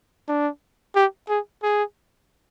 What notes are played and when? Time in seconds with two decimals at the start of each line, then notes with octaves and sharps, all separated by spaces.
0.29 D4
0.96 G4
1.29 G#4
1.63 G#4